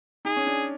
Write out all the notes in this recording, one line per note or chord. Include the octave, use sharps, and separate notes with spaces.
D#4 G#4
C#4
D4